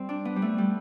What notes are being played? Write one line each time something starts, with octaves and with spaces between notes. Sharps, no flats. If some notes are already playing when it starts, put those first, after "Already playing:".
Already playing: G3 C4
D4
B3
G3
A3
G3